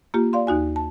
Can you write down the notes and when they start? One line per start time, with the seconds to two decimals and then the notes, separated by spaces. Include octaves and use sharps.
0.14 A#3 F4 G4
0.33 D5 F5 C6
0.47 D#2 D#4 F#4 G#5
0.76 A5